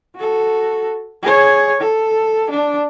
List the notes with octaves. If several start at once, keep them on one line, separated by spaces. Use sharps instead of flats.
F#4 A4
G#4 C#5
A4
D4